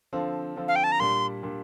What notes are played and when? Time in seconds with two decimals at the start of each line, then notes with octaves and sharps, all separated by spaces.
0.13 D3 F3 C4 F4 A4
0.56 D3 F3 C4 F4 A4
0.68 F5
0.76 G5
0.84 A5
0.92 A#5
1.00 A#2 G3 D4 C6
1.43 A#2 G3 D4